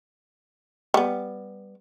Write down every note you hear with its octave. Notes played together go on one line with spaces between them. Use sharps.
G3 B3